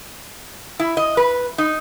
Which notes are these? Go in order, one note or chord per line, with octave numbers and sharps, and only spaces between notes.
E4
D#5
B4
D#4